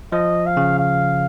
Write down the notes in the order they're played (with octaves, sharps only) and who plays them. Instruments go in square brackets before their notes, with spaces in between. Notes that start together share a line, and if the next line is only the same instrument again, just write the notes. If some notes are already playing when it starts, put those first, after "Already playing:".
[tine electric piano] F3 [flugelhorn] D#5
[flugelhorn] F5
[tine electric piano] C#3
[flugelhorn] F5